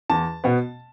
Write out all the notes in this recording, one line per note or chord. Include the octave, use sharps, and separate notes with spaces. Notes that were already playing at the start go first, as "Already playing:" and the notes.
E2 A5
B2 B3